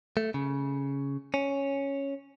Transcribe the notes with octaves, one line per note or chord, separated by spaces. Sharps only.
A3
C#3
C#4